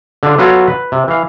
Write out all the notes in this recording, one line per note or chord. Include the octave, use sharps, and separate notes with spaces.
D3 D4 F4
F#3 B3 F4 F#4 A4 C#5
B4
C3
E3 F5